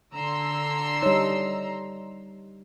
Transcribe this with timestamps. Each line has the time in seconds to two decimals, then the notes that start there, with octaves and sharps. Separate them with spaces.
0.14 D3 A#5 C6 E6
1.02 G3 D#4 C#5